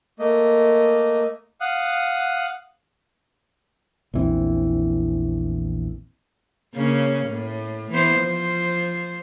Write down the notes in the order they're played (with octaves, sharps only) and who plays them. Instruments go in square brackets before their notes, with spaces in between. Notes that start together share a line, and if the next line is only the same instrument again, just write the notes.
[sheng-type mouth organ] A3 A#3 D#5
F5 F#5 D#6 F#6
[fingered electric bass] A#1 E2 E3 C4
[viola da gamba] C#3 A#3 C#4
A2
E3 B3 C5
F3 C5